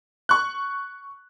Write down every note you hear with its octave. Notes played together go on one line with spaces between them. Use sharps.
C#6 F#6